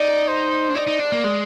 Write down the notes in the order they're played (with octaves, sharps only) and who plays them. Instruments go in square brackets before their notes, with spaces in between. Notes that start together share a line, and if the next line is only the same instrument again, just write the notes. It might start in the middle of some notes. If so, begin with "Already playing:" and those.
Already playing: [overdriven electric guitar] D#4 [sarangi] D5
[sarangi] C5
[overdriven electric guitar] D4
[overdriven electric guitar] D#4 [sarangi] D5
[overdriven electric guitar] D#4
D4
A#3
G#3